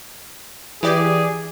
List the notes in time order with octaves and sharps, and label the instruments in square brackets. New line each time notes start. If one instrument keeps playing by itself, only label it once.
[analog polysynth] E3 G4 D5 [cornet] G#4